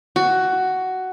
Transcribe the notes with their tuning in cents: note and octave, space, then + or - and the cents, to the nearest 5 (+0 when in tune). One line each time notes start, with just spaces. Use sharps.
F#4 +10